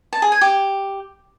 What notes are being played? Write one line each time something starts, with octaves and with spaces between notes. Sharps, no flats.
A5
G#4
G#5
G4